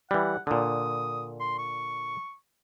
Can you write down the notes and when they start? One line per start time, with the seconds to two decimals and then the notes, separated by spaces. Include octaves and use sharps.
0.11 E3 G3 F#5
0.47 A#2 D3 D#6
1.40 C6
1.59 C#6